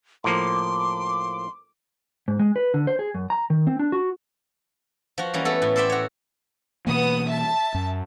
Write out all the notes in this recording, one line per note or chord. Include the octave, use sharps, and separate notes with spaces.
A2 F3 A#3 C6 D6
G#2
G#3
B4
D3
C5
G#4
F#2
A#5
D#3
C4
D4
F#4
F3 F#4
E3 G3 A#3 C#4
A3 B3 A4
A2
A4 C5 D5 E5 G5
F#4 C#5
B2 E3 A#3 B3 D#6
E5 A5
F#2